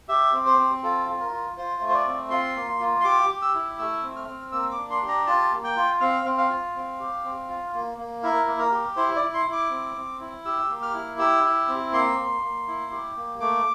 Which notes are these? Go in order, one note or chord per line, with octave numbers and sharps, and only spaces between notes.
G4 E5
C4
C5
C4
F4 A4
F4
A#4
F4
F4 C5
A3
C5
D5
C4
F4 C6
A#3
F4
C6
G4 D6
G4
E6
E4
A3 E6
C4
F6
C4
A#3 E6
D6
D4
C6
G4
A#5
F4 A5
A#3
G5
F4
C4 F5
C4
F5
F4
C4
G4
C4
F4
A#3
A#3
E4 A#4
A#3
A#4
G4
E4 C5
D5
E4
C6
E4
D6
C4
C4
E4
G4 E6
A#3
F6
E4
G4 E6
E4
C4
A#3 C6
A#3
A#3
E4
G4
A#3
A3 D6